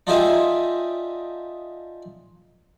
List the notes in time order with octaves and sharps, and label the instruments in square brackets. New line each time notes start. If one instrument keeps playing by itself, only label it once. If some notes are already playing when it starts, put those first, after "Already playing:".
[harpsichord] D4 D#4 F4 G4 G#4 E5